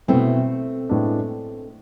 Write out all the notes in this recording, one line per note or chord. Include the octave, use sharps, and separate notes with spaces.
B2 A3 B3 C4 E4
A2 G#3 B3 D4